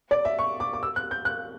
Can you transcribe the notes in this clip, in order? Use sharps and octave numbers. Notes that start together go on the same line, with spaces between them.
D5
E5
C#6
D6
D6
E6
F#6
G6
F#6